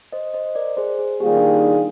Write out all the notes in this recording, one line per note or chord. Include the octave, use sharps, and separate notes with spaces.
C5 D#5
C5 D#5
A#4 D5
G#4 C5
G#4
D#3 G3 A#3 F4 G4 G#4
D4
D#4
D4